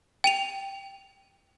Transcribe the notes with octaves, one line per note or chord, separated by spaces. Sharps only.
G5 D#7 F7